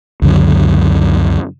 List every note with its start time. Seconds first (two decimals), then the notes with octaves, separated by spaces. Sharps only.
0.22 C#2 F#2 D3 F#3